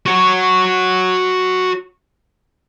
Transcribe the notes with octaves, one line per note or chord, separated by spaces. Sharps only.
F#4 C#5